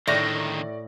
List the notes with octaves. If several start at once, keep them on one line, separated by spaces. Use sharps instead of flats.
A2 D3 D#3 D5 C#6 A#6